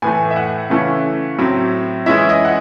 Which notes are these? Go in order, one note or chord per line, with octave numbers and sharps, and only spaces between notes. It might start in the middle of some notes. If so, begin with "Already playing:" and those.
A2 E3 A3 G#5
E5
F#5
C#3 E3 A3 C#4 E4
A2 F#3 C4 E4
E3 G#3 C#4 E4 E5
D#5
F#5